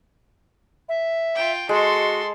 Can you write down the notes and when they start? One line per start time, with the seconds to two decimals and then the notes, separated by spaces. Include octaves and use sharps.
0.88 E5
1.35 F4 G5
1.69 G#3 F#4 A4 C6